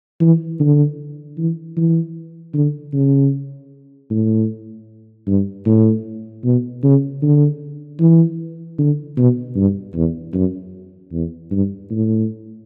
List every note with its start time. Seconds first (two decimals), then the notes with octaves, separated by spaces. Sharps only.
0.21 E3
0.60 D3
1.38 E3
1.77 E3
2.54 D3
2.94 C#3
4.11 A2
5.27 G2
5.66 A2
6.44 B2
6.83 C#3
7.23 D3
8.00 E3
8.79 D3
9.17 B2
9.56 G2
9.95 E2
10.34 F#2
11.12 E2
11.51 G2
11.91 A2